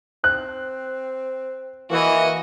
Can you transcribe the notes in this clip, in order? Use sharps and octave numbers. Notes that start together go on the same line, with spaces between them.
C4 F#6
E3 A#3 F#4 D#5